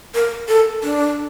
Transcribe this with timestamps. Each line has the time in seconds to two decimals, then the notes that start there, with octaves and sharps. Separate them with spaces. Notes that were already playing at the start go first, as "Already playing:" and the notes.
0.15 A#4
0.49 A4
0.84 D4